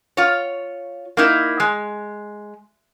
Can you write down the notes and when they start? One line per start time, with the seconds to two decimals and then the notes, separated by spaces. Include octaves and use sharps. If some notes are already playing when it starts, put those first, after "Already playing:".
0.17 F4 C#5
1.17 A#3 D#4 E4
1.60 G#3